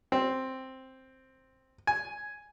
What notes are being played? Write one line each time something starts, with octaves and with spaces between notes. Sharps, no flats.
C4
G#5